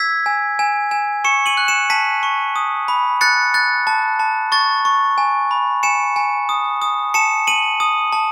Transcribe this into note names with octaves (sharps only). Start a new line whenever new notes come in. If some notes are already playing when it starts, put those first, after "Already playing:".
Already playing: E6 G#6 B6
G#5
G#5
G#5
C#6 C#7 E7
D#7 F#7
F#6
C#7 E7
A5 B6 D#7
C#6
D#6
B5
F#6 A6 C#7
F#6 A6
A5
A5
C#6 A6
C#6
G#5
B5
G#5 C#7 E7
G#5
D#6
D#6
A5 C#7 E7
A5 D#7 F#7
D#6
A5